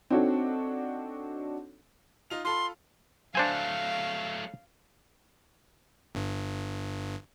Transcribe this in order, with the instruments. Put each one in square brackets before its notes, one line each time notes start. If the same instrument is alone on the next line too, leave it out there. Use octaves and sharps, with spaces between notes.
[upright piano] C4 D4 D#4 F#4 A4 C#5
[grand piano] D#4 F4 F7
[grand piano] F4 A4 B5 [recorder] C6
[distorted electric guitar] F#3 A3 [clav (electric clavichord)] D4 C5 G#5 [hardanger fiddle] F5
[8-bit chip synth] G1 G2